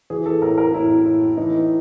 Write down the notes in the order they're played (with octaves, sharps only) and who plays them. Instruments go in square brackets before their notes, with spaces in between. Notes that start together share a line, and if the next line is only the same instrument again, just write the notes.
[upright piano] E3 G#4
A4
A2 A#4
A#4
A2 E4
A2
E3 D#4